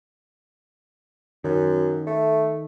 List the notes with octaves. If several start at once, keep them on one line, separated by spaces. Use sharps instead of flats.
F#2 D#3
A3